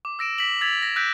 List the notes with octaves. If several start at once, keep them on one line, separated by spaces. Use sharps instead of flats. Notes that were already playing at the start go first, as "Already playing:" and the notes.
D6
E6 A#6 D7 E7
B6 F#7
E6 G#6 A6 B6 F7 F#7
A#6
E6 F#6 G6 A#6 B6 D7